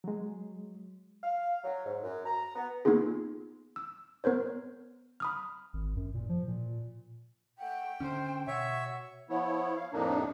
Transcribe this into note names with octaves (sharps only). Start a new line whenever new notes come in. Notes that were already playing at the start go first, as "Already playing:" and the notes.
F#3 G#3
F5
F#3
G#2
F#2
A#5
B3
A#3 B3 D#4 F4 G#4
E6
B3 A#4 C5 C#5
B5 D#6 F6
G#1
F#2
A#2
F3
A#2
A3 F#5 G5
D3 A3 C#4 C5
B2 F#4 C#5 E5
F3 B3 E4 C#5
F5
F2 A2 C3 A#3 D4 D#4